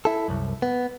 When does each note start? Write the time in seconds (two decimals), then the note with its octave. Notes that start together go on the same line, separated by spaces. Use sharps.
0.05 E4 A4
0.28 C2 F#2
0.62 B3